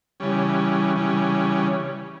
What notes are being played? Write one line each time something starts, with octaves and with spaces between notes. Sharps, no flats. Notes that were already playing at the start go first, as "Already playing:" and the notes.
C#3 E3 G3 C#4
C#3 E3 G3 C#4